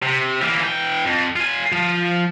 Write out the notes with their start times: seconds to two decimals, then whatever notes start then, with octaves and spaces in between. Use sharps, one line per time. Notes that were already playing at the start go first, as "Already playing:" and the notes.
0.03 C3
0.42 E3 A#3
0.60 E3 G5
1.05 F2
1.36 F4 G#5
1.72 F3